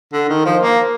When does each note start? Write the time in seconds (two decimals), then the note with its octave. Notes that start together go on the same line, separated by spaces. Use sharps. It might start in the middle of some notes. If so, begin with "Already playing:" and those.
0.13 D3
0.29 D#3
0.46 F3
0.63 A#3